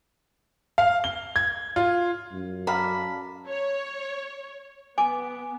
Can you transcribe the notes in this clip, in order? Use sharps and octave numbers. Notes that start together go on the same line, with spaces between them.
F5
G7
G#6
F4
F#2
A4 D5 F5 A#5 B5
C#5
B3 G#5 D6